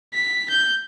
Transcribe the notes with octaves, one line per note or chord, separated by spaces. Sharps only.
B6
G6